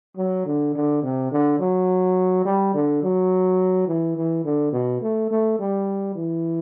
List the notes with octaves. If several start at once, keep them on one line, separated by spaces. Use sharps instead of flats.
F#3
D3
D3
C3
D3
F#3
G3
D3
F#3
E3
E3
D3
B2
A3
A3
G3
E3